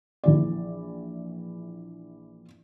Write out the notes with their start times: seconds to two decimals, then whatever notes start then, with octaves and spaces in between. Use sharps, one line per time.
0.24 A#1 E3 D5